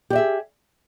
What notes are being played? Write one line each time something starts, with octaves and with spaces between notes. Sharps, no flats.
G4 G#4 D5 E5